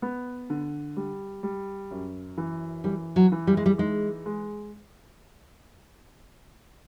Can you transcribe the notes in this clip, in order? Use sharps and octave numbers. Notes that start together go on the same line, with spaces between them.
B3
D3
G3
G3
F#2
E3
E3 G3
F#3
E3
G3
G#3
G3
G#3 D#4
G#3